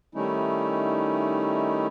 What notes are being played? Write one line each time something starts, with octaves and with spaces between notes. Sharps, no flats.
D#3 G3 A3 C#4 D#4 E4